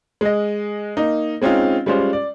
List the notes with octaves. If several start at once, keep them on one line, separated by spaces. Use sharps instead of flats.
G#3 D#5
A#3 D#4
G#3 C4 C#4 D#4 F4
G3 G#3 C#4 F4 C5
D5